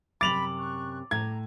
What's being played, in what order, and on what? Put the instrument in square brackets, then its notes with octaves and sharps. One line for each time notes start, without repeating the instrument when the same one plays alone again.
[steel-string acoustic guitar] F#2 C3 [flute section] B5 [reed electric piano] D6 [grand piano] A6 F7 F#7
[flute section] C#6 F#6
[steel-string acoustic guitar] A2 [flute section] A#5 [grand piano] G#6